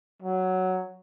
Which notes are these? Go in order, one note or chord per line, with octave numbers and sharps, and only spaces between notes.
F#3